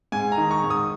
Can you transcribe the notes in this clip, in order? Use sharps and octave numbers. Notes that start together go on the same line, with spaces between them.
G#2 G#5
A#5
D#3
C#6
G#2
D#6